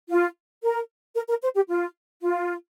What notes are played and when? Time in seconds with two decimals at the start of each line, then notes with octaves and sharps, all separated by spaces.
0.09 F4
0.62 A#4
1.15 A#4
1.28 A#4
1.42 C5
1.55 G4
1.68 F4
2.21 F4